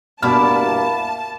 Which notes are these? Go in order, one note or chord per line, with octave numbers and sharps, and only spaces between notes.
D2 G2 B2 A#3 E4 D5 A5 F6